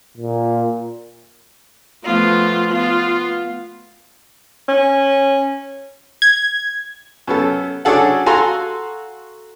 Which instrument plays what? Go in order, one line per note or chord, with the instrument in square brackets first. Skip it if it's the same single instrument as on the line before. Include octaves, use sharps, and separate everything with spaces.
[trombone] A#2
[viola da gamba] F3 A3 B3 [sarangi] F4
[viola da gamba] B3 [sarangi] F4
[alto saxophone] C#4
[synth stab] G#6
[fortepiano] F#2 B3 A4
F#3 C#4 D4 G#4 A4 F#5
F#4 A4 F5 G#5 A#5 C6